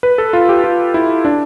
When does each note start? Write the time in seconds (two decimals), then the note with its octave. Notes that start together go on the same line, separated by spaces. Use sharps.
0.03 B4
0.18 A4
0.33 F4
0.49 G4
0.64 F4
0.94 E4
1.25 D4